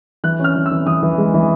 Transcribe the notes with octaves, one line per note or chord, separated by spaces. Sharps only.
E3 F#6
C#4 F6
E3
E6
E3
E3 D#6
E3
G#3
E3